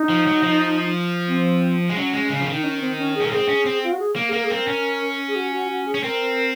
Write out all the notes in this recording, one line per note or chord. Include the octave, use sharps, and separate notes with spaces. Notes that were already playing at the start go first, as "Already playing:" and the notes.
Already playing: D#4
F3
F#3
F3
C4
G#3
F#3 C#4
G#3
C#3
F3
D#3
D#4
C#4
C4
C#4
G#4
C#4 A#4
C4 G#4
C#4
C4
F4
F#4
G#4
A#3
G#4
A#3 A#4
G#4
C4 A#4
C#4
G#4
F#4
F#4
F#4
G#4
C#4
C4 A#4